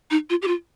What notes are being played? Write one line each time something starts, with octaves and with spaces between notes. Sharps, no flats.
D#4
F4
G4
F4